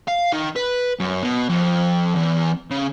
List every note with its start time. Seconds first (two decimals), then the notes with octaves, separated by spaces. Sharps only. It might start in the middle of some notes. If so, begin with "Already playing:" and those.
0.08 F5
0.33 D#3
0.56 B4
1.00 F#2
1.23 B2
1.49 F2
2.15 E2
2.70 C#3